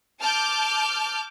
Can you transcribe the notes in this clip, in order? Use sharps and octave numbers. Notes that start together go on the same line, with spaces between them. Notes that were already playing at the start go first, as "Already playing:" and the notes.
A5 D6 F6 G6